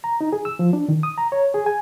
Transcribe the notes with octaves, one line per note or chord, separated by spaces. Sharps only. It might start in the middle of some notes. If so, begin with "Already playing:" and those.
A#5
D#4
G#4
E6
F3
D4
D#3
D#6
A#5
C#5
G#4
G#5